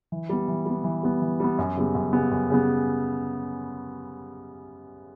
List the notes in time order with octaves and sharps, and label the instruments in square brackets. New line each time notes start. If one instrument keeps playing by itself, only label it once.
[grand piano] E3
G3 B3
E3
G3 B3
E3
G3 B3
E3
G3 B3
F#2
C#3 G3 B3
F#2
C#3 G3 B3
F#2
C#3 G3 B3